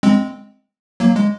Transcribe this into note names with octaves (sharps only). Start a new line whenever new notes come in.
G#3 C4
F#3 A#3
G#3